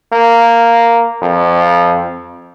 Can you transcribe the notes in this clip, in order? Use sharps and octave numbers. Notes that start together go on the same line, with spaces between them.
A#3
F2